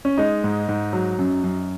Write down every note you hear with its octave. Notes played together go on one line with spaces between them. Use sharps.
C#4
G#3 D#4
G#2
G#2
F#3
F#2
F#2